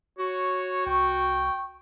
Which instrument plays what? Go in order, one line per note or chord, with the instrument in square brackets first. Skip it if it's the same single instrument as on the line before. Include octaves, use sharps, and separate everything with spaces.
[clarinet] F#4 [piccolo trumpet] C#5
[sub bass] C2 [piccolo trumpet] G5 [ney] C#6